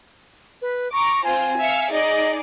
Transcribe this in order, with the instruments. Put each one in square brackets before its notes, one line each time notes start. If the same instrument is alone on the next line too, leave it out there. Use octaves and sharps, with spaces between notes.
[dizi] B4
[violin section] A#5 D6 [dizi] C#6
[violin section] C4 F4 C5 [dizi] G#5
[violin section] E5 F5 C#7
[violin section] D#4 G#4 D5 [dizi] D#5